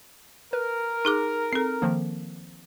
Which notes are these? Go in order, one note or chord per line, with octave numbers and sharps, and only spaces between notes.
A#4 B4
D#4 G#4 D6
C4 A4
D#3 F3 A#3